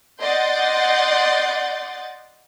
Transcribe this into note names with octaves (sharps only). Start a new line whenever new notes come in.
D5 D#5 F#5 C6 G6 A6